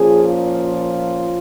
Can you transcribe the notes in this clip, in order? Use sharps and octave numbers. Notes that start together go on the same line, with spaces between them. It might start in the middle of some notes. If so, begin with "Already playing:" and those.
Already playing: A#2 F3 C#4 G#4
F4